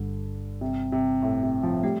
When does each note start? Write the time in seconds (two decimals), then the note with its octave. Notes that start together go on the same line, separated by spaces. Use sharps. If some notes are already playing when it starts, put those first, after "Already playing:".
Already playing: G1 G2 D3 G3
0.61 C3
0.92 C3
1.22 A2
1.43 C3
1.63 F3
1.83 G3 A3